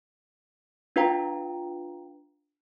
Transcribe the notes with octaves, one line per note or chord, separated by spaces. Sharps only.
D4 F4 B4 F5 G5 A#5